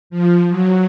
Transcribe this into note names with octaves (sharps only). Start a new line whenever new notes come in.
F3
F#3